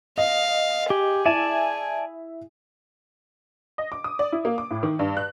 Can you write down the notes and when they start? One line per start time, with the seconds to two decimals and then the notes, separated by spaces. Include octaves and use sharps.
0.18 D#5 F5
0.90 G4 G#4
1.25 E4 D5 E5 G#5 A5
3.78 D#5
3.92 D6
4.04 D#6
4.19 D5
4.32 E4
4.45 A#3
4.58 D6
4.71 A2
4.83 D#3
4.99 G2
5.17 F#6